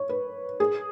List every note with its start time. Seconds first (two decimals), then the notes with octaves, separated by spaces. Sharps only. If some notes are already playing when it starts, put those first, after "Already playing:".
Already playing: C#5
0.09 B4
0.60 G#4